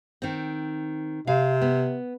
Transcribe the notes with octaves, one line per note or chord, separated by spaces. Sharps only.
D#3 C4
C3 F5
B3